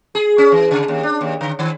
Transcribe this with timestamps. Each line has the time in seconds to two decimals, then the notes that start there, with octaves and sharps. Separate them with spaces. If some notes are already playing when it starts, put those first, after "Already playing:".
0.15 G#4
0.38 C#4
0.52 E3
0.71 C#3
0.88 D#2
1.03 D4
1.21 D#2
1.41 D3
1.59 D#3